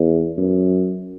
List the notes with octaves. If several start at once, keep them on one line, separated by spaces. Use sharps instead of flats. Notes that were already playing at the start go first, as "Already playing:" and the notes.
Already playing: E2
F#2